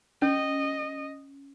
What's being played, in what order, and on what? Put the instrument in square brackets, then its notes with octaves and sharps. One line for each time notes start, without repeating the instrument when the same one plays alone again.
[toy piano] C#4 [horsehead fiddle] D#5